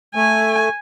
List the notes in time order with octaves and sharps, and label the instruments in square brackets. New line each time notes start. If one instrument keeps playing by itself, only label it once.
[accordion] A3 [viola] G#5